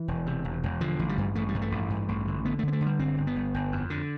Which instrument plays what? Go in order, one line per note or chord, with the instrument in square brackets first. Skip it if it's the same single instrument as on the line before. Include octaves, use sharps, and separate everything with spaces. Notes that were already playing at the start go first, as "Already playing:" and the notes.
Already playing: [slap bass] E3
E1
C3
E1
E1
D3 F3
A1
G3
G2
A1 A3
G3
G2
A3
A1
G2
A1
D3
D3 B3
A3
D3 B3
A3
D3
G3
G1 C4
G1
B3
G1
G1
F2
D3